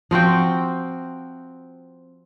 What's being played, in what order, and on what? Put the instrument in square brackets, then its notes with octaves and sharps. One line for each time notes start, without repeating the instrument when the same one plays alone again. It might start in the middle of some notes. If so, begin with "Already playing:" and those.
[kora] F3 C4 F#4 G5